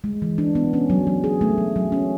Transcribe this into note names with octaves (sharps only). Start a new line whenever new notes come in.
G#3
E3
D4
B3
C#4
F#3
F#3
G#4
A3
F#3
F#3
C#4